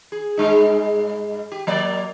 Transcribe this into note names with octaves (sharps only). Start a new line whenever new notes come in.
G#4
G2 G#3 D#4
G4
F#3 A#3 D5